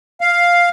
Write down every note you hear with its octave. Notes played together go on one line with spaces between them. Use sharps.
F5